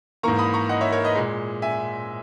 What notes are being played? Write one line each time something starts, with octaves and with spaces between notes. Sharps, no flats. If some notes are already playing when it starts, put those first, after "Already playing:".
G#2 E3 A#3 A#5 C#6
B5 D#6
A#5 C#6
D#5 F#5
C#5 E5
A#4 C#5
B4 D#5
A#2 G#3
E5 G#5